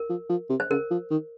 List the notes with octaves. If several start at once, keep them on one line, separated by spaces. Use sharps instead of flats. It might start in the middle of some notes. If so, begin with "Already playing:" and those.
Already playing: A#4
F3
F3
C3
C5
C#3 A#4
F3
D#3